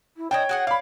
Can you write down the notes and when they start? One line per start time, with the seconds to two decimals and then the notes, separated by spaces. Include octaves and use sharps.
0.17 E4
0.31 D4 E4 C#5 D#5 G5
0.49 F#4 G#4 F#5
0.67 D5 F5 B5